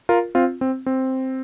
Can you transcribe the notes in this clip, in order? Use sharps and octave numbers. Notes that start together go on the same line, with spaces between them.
F4 A#4
C4 F4
C4
C4